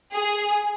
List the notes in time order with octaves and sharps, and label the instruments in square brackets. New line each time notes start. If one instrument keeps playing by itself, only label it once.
[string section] G#4